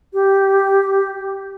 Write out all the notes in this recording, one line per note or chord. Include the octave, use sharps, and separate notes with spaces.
G4